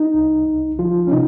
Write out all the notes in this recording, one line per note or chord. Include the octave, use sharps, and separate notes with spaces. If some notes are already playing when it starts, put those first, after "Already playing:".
Already playing: D#4
C2
C2
F3 F4
C#4
C3 D#4